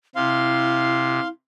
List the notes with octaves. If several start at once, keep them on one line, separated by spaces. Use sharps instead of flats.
C3 E4 F5 C6